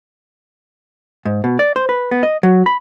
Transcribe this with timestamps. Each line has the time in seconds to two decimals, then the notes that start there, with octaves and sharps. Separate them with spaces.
1.25 G#2
1.44 B2
1.59 D5
1.76 C5
1.89 B4
2.11 B3
2.23 D#5
2.43 F#3
2.66 B5